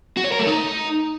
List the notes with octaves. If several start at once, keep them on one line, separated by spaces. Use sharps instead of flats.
F#4
C#5
A#4
A3
D#4